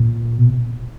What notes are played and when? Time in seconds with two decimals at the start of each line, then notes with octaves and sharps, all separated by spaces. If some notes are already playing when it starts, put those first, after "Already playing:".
Already playing: A#2
0.38 B2